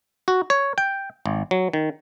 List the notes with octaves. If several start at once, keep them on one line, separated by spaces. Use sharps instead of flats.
F#4
C#5
G5
G#1
F#3
D#3